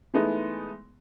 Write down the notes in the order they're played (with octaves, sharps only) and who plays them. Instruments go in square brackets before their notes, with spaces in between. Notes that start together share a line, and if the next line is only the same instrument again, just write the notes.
[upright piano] E3 G#3 A3 B3 D#4